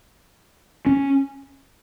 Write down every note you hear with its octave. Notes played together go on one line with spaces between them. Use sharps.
C#4